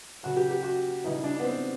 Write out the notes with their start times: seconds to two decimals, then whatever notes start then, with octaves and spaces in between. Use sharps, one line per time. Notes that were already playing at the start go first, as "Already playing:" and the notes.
0.23 C#3 F#3 F#4
0.37 G4
0.51 G4
0.63 F#4
1.04 C#3 E3 G3 D#4
1.24 D4
1.39 B3
1.44 C4